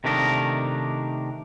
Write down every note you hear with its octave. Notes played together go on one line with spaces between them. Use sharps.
C3 D#3 A3 D4 A#4 D#5